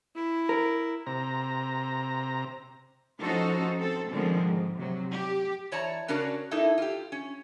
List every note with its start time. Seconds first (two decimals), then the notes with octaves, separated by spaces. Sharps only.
0.16 E4
0.49 A#4
1.07 C3 A#5
3.20 F3 C#4 D#4 F#4 A4 C5
3.79 C4 A4
4.10 B2 D3 D#3 F3 G#3 C4
4.41 G#2
4.78 C3 F#3
5.12 G4
5.72 E3 C#5 D5 A5 A#5
6.08 C#3 C#4 D4 F#4 A#4 D5
6.51 A#3 D#4 E4 A4
6.78 F4 G4
7.12 C#4